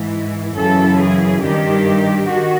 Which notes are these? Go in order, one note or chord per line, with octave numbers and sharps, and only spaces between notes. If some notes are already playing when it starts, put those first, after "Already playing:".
Already playing: G#2 E3
F#2 C#3 E3 A4
G#4
G2 D#3 G4
D#3 F#4